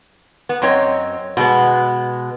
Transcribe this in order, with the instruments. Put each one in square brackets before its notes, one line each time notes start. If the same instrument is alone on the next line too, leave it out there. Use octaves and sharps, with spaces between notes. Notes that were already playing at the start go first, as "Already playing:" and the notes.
[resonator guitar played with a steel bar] B3
F#2 C4 C#5 D#5
B2 G#3 B3